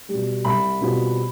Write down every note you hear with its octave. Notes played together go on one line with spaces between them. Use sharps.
B2 G3
C2 B5
B2 G3 C4 F4